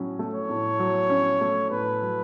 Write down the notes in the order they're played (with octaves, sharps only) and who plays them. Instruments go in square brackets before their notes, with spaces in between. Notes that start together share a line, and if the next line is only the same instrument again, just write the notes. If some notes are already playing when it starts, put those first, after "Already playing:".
Already playing: [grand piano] A2 F#3 C#4
A3
[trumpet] C#5
[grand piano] A2
F#3
C#4
A3
[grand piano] A2 [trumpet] B4
[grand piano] F#3